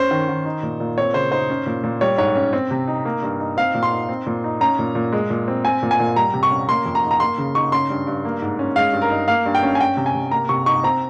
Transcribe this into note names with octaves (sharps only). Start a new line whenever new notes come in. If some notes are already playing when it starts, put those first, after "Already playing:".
Already playing: C#4 C5
D#3
D#3
D#4
A#2
A#2
C4 C#5
C#3 C5
D#4 C5
C#4
A#2
A#2
G3 C#5
G#2 C#5
C#4
C4
C3
D#4
A#3
G2
D#4
C4 F5
A#2
C6
D#4
C4
A#2
D#4
C#4 A#5
A#2
A#2
G#3
A#2
C4
C4 G#5
A#2
G#5
A#2
G3 A#5
C3
C#6
C#4
A#3 C6
F2
A#5
D#4
A#5
A#3 C6
C#3
D#4 C#6
C#4 C6
G2
G2
A#3
G#2
C#4
G#3 F5
G2
A#4
D#4
A#3 F5
G2
G5
C#4
G#5
C#4 G5
C3
G#5
C3
A#3 A#5
C3 C#6
D#4 C#6
C4 A#5